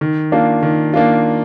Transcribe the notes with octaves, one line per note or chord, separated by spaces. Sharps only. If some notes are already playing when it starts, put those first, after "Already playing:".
D#3
A#3 D4 F4
D#3
A#3 D4 F4